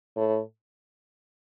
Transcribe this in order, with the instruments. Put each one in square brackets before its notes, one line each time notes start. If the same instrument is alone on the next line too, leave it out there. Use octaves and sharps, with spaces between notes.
[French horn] A2